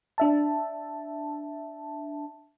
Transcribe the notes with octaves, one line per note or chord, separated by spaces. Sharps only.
D4 E5 A5